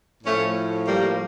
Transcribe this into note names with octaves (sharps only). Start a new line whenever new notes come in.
A2 F3 A3 C#4
G3 A#3